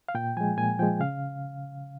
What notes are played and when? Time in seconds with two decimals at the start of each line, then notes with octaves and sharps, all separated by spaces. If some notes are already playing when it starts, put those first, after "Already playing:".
0.09 F5
0.15 A#2 G5
0.37 F3 G#3 G#5
0.58 A#2 G#5
0.79 F3 G#3 G5
1.00 C#3 F5